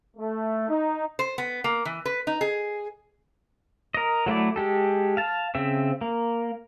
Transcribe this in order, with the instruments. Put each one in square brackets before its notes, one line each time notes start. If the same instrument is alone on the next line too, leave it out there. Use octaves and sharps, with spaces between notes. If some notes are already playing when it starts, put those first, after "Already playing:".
[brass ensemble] A3
D#4
[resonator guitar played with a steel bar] C5
B3
A#3
E3
B4
D#4
G#4
[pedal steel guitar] A#4 D#5
F#3 A3 E4 D5
G#3 G4 A4
F5 A5
C#3 C4 E5
A#3